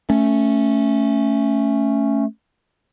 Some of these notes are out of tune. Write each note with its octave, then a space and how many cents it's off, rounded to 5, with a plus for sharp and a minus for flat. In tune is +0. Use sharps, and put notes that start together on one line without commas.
A3 +5 C#4 +0